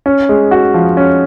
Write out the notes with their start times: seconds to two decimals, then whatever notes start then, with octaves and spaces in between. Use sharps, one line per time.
0.06 C#4
0.29 G#3
0.51 F#4
0.74 F3
0.97 C#4